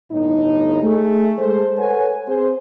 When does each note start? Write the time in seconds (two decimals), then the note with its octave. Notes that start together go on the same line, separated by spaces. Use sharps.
0.12 G1 A2 D#4
0.83 A3 G#4
1.39 G#3 A4 C5
1.78 A4 B4 C#5 F#5 G#5
2.28 C4 G#4 C5